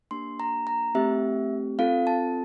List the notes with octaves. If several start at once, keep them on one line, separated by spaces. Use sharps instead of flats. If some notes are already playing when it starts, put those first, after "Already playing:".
A#3 D4 G4 C6
A#5
A#5
A3 C4 G4 E5
C4 F4 A4 F5
A5